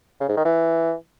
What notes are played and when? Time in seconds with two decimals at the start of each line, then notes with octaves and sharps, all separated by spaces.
0.20 C#3
0.28 G#2
0.37 D#3
0.45 E3